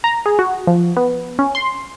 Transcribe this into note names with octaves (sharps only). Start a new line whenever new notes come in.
A#5
G#4
F#4
F3
B3
C#4
C6